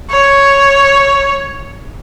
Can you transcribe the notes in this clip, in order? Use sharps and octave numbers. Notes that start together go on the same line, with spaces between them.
C#5